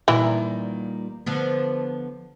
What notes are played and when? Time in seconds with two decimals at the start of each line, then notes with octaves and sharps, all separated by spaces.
0.08 A#2 D#3 E3 G3 E4
1.26 D3 F3 B3